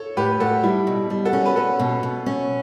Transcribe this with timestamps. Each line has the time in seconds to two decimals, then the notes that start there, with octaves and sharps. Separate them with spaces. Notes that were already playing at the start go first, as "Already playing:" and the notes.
Already playing: A4 C#5
0.17 A2 G4 B4
0.40 A2 F#4 A4
0.63 G3 E4
0.87 B2
1.10 G3
1.25 F#4 A4
1.33 C#4
1.46 B4
1.56 C#4 F#4 A4
1.79 B2
2.03 B2
2.26 C#4